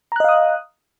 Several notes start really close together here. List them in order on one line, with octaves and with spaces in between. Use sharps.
A#5 F#6 D#5 F5 D#6